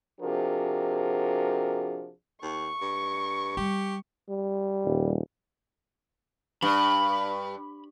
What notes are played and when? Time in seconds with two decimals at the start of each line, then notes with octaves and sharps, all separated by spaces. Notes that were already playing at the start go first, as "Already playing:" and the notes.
0.21 C3 F3 D4 F#4 G#4 A#4
2.43 D#2 C#6
2.82 G2
3.57 G3 G4
4.29 G3
4.85 D#1
6.62 G2 B5